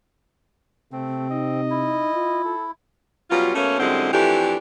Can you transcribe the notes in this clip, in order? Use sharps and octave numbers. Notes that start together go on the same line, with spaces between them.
C3 A3 C4
D#4 D#5
E4
F4
A4
B2 F#3 G3 C#4 F4
B2 A3 A#3 C#4
F#2 D3 G3 G#3 C4 E4
F2 E3 A3 D4 G4